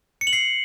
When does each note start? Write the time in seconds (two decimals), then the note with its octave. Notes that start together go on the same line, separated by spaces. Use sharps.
0.21 C#7
0.27 F#7
0.33 C7